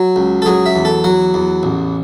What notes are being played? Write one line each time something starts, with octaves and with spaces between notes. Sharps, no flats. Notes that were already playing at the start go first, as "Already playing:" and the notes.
Already playing: F#3
C#2
A4
F#3 G#4
E5
E2
A4
F#3 F#5
E2
A1